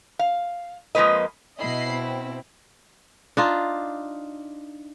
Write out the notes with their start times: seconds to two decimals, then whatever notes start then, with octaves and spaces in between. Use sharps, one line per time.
0.19 F5
0.95 F2 F3 G#3 A#3 B4 D#5
1.58 B2 E4 D#5 B5 C7
1.91 C4
3.37 D4 D#4 F4